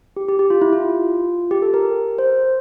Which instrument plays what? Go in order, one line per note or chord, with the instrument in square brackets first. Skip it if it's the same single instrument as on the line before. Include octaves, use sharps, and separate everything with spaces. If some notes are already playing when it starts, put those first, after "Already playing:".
[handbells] G4
G4
G4
F4
E4
F4
G4
A4
A#4
C5